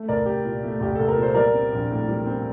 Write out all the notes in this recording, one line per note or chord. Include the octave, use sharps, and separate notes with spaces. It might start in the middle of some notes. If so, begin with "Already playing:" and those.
Already playing: A3
C2 A#4 D5
C2 G4
A#2
A3
C2 G4
C2 A4
A#4
A#2
C5
G3 A#4 D5
C4
A#1
A2
G3
C4